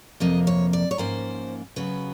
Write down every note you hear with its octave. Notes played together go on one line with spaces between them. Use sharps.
F2 C3 F3 A#3 D#5
C#5
D5
C#5
G#2 F3 A#3 C#4 C5
C#3 F#3 B3 B4